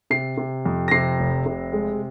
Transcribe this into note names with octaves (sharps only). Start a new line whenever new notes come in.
C3 C7
C3
F2
A#6
C3 C7
F1
C3
G#3